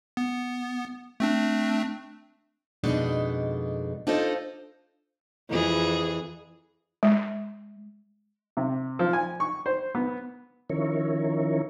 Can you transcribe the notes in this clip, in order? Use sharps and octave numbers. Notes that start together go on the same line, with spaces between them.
B3
A3 C4 D4
F2 B2 G#3 D4 D#4
D4 D#4 F4 A4 C5 D#5
F2 E3 G#4
G#3
C3
F3
G#5
C#6
C5
B3
D#3 F3 C#4 E4 A#4 C#5